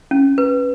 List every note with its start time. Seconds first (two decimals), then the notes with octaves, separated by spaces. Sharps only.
0.11 C#4
0.38 B4